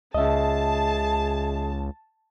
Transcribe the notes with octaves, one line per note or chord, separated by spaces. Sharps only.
C#2 G#4 D#5 E5 A5